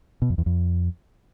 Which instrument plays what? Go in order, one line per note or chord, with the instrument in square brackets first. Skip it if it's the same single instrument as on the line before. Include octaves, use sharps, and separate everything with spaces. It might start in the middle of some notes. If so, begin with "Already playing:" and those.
[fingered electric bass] B2
F2
E2
F2